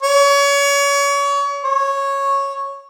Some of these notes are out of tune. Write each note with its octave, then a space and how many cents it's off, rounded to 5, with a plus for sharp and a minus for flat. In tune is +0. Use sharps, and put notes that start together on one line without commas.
C#5 +30
C#5 -10